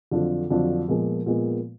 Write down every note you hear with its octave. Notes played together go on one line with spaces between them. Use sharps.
F2 D3 F#3 D4 F4
F2 D3 F#3 D4 F4
A#2 F3 G#3 B3
A#2 F3 G#3 B3